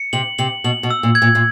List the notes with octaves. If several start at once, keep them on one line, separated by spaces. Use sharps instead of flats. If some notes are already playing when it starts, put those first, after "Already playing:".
Already playing: C#7
C3 F#7
C3 F#7
B2 F#7
B2
E6
A#2
G#6
A#2
A#2